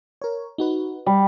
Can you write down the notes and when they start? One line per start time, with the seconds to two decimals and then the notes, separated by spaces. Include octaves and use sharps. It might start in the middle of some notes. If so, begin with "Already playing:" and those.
0.22 A#4 C#5
0.58 D#4 F#4 B4
1.06 G3